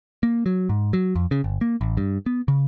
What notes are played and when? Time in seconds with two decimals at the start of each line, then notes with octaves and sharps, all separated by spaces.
0.23 A#3
0.46 F#3
0.69 G#2
0.93 F#3
1.16 F2
1.31 C#3
1.44 G1
1.61 A#3
1.81 A1
1.97 G2
2.26 B3
2.48 C#3